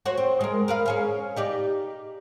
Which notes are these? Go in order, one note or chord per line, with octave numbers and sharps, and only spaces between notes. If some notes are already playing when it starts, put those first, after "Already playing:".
F#4 C5 C#5
C4
G#3 A#4
A#4 B4 F5
C#4 G#4 F5
D#4 G4 D5